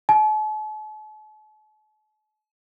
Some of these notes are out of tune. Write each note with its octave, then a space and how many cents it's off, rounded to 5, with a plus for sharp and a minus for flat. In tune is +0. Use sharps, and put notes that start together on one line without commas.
A5 -45